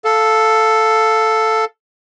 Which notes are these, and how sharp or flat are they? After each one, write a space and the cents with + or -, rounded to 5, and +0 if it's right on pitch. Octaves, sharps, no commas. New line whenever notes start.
A4 +0 F5 +0